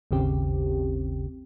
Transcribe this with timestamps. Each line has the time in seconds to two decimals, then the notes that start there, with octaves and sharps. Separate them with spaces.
0.11 G#1 D#2 C#3 C4 G4